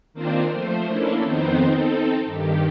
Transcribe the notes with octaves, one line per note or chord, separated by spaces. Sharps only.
D#3 A#3 C4 D4 F4 C5
F3 A3 C5
A#3 C#4 D4 E4 A4
F2 D#3 B3 C4 D#4 C5
C4 D#4 A4
G2 D#3 G4